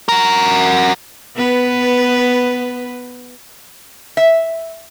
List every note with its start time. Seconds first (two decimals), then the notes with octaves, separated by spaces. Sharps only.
0.09 F#4 A#4
1.36 B3 B4
4.17 E5